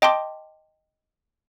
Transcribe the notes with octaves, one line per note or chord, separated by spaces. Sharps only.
D#5 G5 A5 C6 D6